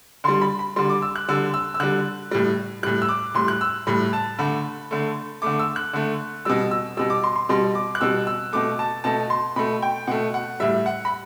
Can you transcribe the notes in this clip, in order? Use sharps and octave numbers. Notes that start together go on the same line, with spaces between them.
D3 G3 C6
B5
B5
D3 G3 C6
D6
E6
F#6
D3 G3 E6
E6
E6
D3 G3 F#6
A2 G3
A2 G3 F#6
E6
D6
A2 G3 C6
F#6
E6
A2 G3 B5
A5
D3 A3 B5
D3 A3
D3 A3 D6
E6
F#6
D3 A3
B2 G3 E6
E6
B2 G3 E6
D6
C6
C6
B2 G3 C6
D6
F#6
B2 G3 E6
E6
B2 A3 D6
A5
B2 A3 A5
C6
B2 A3 B5
G5
B2 A3 F#5
F#5
A2 G3 E5
F#5
B5